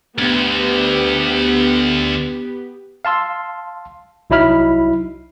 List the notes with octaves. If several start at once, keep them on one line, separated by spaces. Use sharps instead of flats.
D2 B3 G4
F5 A5 C6 E6
C2 F#3 D#4 E4 B5 F6